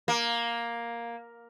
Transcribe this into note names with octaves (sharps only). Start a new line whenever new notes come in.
A#3